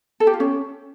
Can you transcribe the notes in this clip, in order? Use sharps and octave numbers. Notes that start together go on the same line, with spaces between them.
A4
G4
F4
C#4